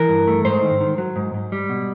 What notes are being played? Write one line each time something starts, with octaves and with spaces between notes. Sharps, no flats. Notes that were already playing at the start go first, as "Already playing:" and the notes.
Already playing: E3 A#4
G2
A3
G#2 C5
D#3
D#3
F#3
G#2
G#2
G3
B2